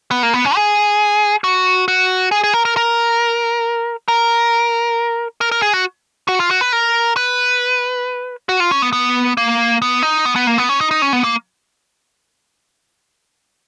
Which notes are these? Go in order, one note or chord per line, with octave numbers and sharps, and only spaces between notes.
B3
A#3
B3
C#4
G#4
F#4
F#4
G#4
G#4
A#4
A#4
A#4
A#4
A#4
A#4
G#4
F#4
F#4
F4
F#4
B4
A#4
B4
F#4
F4
C#4
B3
B3
A#3
B3
D#4
B3
B3
A#3
B3
C#4
D#4
D#4
C#4
B3
A#3